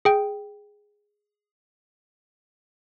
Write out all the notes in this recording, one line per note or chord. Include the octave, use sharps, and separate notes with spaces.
G#4 G5